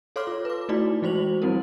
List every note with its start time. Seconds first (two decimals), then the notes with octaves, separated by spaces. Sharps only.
0.16 A4 C#5 F5 C6 D6 F6
0.27 F4
0.45 B4 D6
0.69 A3 D#4 E4 F#4 D5
1.02 E3 G#3 F#4 C5 F7 F#7
1.42 F#3 G3 C4 E4 A#4